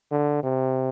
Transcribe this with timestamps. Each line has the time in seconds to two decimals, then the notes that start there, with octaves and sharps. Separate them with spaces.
0.11 D3
0.43 C3